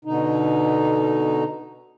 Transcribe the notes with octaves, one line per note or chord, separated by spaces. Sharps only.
B2 D3 D#4